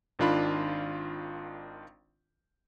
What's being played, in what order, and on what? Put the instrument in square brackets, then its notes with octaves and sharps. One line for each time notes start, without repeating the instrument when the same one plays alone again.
[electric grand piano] G#1 D#3 D4 F4 B5